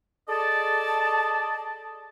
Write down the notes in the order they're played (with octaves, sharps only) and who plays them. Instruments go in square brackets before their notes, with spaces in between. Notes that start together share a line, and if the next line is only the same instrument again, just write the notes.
[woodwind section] G#4 A4 D5 D#5 A5